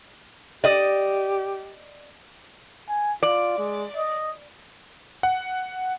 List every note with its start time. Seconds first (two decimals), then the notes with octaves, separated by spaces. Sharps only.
0.64 G4 D5 D#5
2.88 G#5
3.23 F4 D5
3.58 G#3
3.96 D#5
5.23 F#5